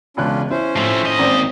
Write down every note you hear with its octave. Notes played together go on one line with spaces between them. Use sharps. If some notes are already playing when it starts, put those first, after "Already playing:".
E1 C#2 C#4 D4 F4 F#6
C#4 E4 C5
A2 F3 A3
D#2 D#5
G#1 C4